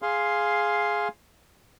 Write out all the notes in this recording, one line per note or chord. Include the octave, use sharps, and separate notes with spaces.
G#4 F5 C6